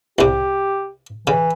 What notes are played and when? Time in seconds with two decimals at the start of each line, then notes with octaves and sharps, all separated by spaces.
0.19 C2 C3 G4
1.27 C#3 E3